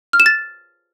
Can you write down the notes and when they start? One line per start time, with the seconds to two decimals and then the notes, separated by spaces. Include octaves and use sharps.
0.13 F6
0.20 E7
0.26 A6